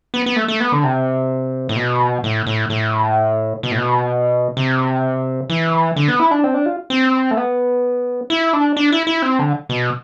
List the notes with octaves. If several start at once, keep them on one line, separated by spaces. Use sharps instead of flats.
B3
B3
A3
A3
B3
D3
C3
A2
B2
A2
A2
A2
B2
A2
B2
C3
E3
D3
B3
E4
D4
C4
D4
F4
C4
A3
B3
E4
D4
D4
E4
E4
C4
D3
B2